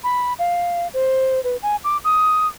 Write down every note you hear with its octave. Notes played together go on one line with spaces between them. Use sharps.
B5
F5
C5
B4
G#5
D6
D#6